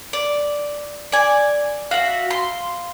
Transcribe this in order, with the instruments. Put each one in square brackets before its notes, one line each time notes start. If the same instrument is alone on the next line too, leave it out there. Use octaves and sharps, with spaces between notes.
[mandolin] D5
D5 G#5
[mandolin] F#4 E5 [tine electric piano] F5
[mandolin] C6